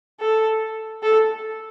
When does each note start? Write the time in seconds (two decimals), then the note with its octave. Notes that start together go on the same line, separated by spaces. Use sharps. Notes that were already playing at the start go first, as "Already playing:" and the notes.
0.20 A4
1.03 A4